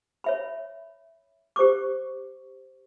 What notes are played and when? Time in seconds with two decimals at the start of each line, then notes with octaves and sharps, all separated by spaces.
0.24 C#5 E5 B5
1.56 G4 C5 C#6 D6